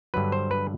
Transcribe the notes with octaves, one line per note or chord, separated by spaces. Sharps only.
G2 D3 F#3 B4
C5
B4